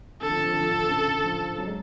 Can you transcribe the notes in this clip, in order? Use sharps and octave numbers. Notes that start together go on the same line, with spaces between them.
D3 A4
F3
D3
F3
D3
F3
D3
C#3
F3
F#3
G#3